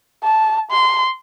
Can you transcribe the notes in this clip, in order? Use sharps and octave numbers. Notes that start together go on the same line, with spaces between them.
A5
C6